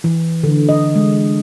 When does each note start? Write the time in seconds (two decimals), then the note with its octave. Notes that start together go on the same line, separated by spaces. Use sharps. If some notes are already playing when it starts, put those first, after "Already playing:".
0.04 E3
0.44 D3
0.69 D#5
0.95 G#3